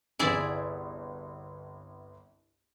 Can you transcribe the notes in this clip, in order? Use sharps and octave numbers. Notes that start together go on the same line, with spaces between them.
G1 C2 E4 G#4 D5